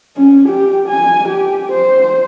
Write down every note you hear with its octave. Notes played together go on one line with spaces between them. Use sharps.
C#4
G4
G#5
G4
C5